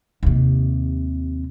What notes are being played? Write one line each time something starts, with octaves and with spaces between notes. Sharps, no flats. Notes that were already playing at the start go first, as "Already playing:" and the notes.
D#2 C3